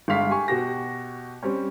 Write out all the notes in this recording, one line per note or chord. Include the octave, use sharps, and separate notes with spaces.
G1 G#3 F5 B6
G4 G#5 C#6
B2 F#4 G4 A#6
G3 C4 C#4